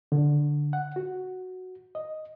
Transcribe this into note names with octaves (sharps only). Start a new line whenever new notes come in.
D3
F#5
F#4
D#5